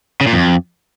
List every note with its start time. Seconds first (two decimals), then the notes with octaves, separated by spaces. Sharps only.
0.21 C#3
0.27 A#2
0.33 F2